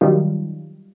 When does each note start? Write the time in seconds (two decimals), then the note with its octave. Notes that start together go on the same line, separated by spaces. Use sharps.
0.01 D#3 F#3 G3 D#4 F4